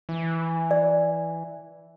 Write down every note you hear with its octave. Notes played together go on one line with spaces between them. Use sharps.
E3
D5